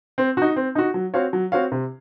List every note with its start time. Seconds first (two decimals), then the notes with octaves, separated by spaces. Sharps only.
0.18 C4
0.37 D#4 F#4
0.56 C4
0.75 D#4 F#4
0.94 F#3
1.14 C4 F#4 C#5 F5
1.33 F#3
1.52 C4 F#4 C#5 F5
1.72 C3